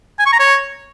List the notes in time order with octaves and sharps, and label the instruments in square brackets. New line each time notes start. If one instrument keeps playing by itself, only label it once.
[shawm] G#5
C#6
A#5
C#5